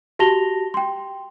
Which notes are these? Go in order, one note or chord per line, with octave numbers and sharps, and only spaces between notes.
F#4 G4 A5 A#6 F7 G7
G5 C6